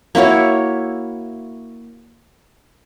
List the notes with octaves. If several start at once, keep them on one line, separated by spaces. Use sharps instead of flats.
A#3 E4 F#4 C#5